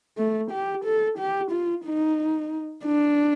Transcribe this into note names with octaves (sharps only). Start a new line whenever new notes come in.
A3
G4
A4
G4
F4
D#4
D4